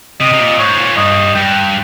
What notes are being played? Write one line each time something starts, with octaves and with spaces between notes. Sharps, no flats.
C3 D#5
C3
A#2
G#2 C#5
A#2
G2 D#5
G2 G5